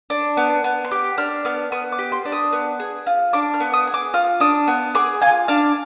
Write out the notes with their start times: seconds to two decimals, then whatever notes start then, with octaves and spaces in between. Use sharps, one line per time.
0.10 D4
0.37 B3
0.64 B3
0.85 C6
0.91 G4 D6
1.18 D4 F6
1.45 B3 F6
1.72 B3 D#6
1.92 D6
1.99 G4
2.12 C6
2.25 D4
2.32 D#6
2.53 B3
2.80 G#4
3.07 F4
3.33 D4 D6
3.54 F6
3.60 B3
3.74 D#6
3.87 G#4
3.94 D6
4.14 F4 F6
4.40 D4 D#6
4.68 B3
4.95 G#4 D6
5.22 F4 G#5
5.48 D4 F5